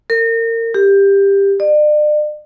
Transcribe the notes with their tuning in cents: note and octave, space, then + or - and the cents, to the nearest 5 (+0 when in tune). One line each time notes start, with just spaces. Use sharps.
A#4 -30
G4 +15
D5 +40